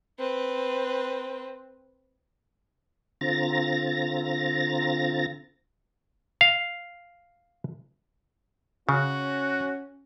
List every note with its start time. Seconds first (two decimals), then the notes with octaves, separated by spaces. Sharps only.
0.19 C4 B4
3.21 D3 C4 F4 A#5 A6 A#6
6.41 F5
8.89 C#3 C#4 F#4